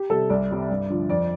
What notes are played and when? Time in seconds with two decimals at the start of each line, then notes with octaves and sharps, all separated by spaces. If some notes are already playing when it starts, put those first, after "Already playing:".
Already playing: G4
0.10 C3 G3 A4
0.30 C2 D5
0.51 C3 G3
0.70 G2
0.90 D3 F3
1.09 F2 D5